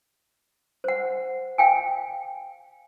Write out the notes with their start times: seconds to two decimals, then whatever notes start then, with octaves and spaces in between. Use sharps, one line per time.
0.84 C5 F#5
1.58 F5 G5 G#5